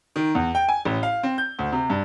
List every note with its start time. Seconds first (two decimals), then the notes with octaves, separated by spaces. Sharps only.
0.16 D#3
0.35 E2
0.55 G5
0.68 G#5
0.85 A1
1.03 F5
1.23 C4
1.38 G6
1.59 D2
1.72 C3
1.90 G2